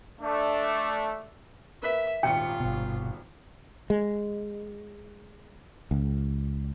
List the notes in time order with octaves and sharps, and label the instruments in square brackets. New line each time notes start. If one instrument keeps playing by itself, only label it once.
[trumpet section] A3 D4
[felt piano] A#3 B4 B6 [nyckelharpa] E5
[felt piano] D#1 G#1 C#7 [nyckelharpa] F4 [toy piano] G5
[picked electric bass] G1 B2
[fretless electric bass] G#3
C#2